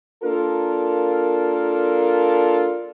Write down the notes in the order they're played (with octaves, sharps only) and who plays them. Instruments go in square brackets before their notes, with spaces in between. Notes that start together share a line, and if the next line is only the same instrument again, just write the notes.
[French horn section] A#3 D4 F4 A4 A#4